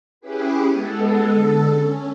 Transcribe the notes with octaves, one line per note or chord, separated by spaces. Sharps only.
C#4 E4 G4 G#4 B4
G#3 B3 A4
D3 A4
C#4